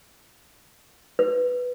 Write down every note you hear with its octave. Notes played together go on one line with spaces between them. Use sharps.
B4